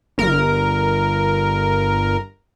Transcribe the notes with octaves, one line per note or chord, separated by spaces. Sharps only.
G1 A#4